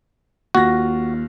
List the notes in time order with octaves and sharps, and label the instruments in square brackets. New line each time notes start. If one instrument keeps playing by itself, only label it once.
[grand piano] D#2 F4 A#6 [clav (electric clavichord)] F#4